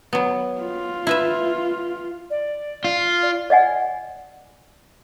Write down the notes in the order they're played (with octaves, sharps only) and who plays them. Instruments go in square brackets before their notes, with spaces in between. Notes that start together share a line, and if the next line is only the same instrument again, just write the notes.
[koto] F#3 B3
[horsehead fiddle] F4
[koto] E4 B4 E5
[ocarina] D5
[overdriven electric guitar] F4
[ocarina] D5
[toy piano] D5 D#5 F#5 G#5